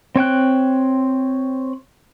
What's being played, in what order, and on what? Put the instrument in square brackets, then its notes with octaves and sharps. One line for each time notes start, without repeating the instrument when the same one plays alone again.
[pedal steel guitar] C4 C#5 G5 F#6